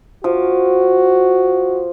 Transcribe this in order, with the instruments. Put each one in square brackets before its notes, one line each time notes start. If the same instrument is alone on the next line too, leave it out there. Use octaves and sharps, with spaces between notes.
[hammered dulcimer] F3 [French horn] F#4